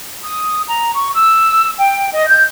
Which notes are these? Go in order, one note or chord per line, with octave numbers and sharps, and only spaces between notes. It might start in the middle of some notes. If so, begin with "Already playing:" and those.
D#6
A#5
C#6
E6
G5
D#5
G6